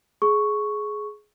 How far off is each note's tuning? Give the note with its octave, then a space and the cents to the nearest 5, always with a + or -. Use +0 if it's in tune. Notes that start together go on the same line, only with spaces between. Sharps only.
G#4 +15 C#6 +0